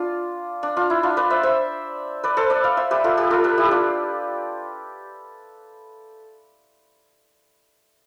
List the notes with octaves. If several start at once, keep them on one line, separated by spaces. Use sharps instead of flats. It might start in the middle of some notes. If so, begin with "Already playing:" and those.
Already playing: D4 F4
D4
D4 F4
E4
D4 F4
B4 D5
C5 E5
C5 E5
B4 D5
A4 C5
B4 D5
D5 F5
C5 E5
G4 B4
F4 A4
G4 B4
F4 A4
G4 B4
E4 G4
D4 F4